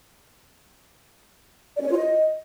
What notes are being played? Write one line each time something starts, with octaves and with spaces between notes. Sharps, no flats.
D5
C#4
C#5
F4
D#5